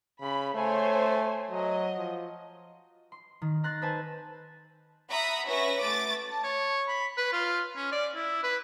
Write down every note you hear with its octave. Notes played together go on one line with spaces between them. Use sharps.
C#3 B5
A3 C5 C#5 G#5
F#3 D#5
F3
C6
D#3
A#5 C6 F#6 A6 A#6
A4 B4 C5 G#5 A5
E5 F#5 A#5 B5 D#6
C#4 F#4 B4 E5 A#6
A3 D6 A6
A5
C#5
B5
B4
F4
C#4
D5
E4
B4